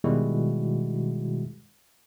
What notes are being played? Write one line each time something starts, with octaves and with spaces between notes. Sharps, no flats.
B2 D#3 G3 G#3 E4 F#4